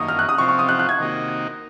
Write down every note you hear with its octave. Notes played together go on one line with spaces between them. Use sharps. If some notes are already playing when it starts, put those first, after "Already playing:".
Already playing: F#2 D#3 A#3 C#6 D#6
F6
F#6
D#6
C3 F3 C4 F4 C#6
C#6
D#6
F#6
F#6
G#6
C3 D#3 A#3 D#4 F#4